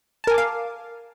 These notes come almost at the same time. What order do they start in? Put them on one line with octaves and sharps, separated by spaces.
A5 A#4 G#5 D6 F5